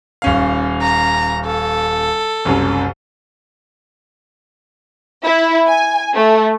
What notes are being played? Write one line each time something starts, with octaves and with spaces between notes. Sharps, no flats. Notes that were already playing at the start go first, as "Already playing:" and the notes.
D#1 C#4 F5
A#5
A4
F#1 C2 F#2
E4
G#5
A3